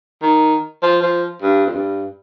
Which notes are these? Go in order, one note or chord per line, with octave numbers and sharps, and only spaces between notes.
D#3
F3
F3
G2
F2
G2